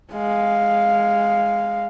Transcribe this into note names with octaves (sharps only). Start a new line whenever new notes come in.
G#3 F5